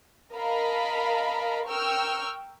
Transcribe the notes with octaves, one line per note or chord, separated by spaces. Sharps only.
A#4 D#5 F5 A5 B5
A#4 G5 C#6 E6 F6